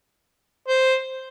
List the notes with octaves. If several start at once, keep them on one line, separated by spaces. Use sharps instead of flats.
C5